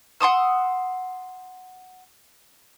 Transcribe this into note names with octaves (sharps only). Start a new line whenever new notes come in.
F#5 C6 D#6 E6